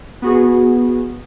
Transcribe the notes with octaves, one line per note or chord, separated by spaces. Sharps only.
B3 F#4 G#4